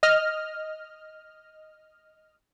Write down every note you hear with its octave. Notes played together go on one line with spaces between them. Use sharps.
D#5 F6